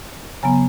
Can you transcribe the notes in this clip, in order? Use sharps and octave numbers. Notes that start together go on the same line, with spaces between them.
C#3 F#3 B3 G#5 A#5